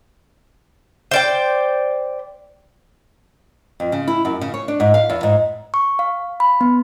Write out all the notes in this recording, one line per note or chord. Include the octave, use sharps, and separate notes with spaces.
C5 D5 G5
F2
C#3
E4
F#2
C#3
C#5
D4
G#2
F5
E2
G#2
C#6
F5
B5
B3